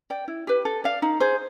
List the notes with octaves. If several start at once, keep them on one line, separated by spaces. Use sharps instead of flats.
D5 G5
E4
G4 B4
A4
D5 F5
D#4
G#4 C5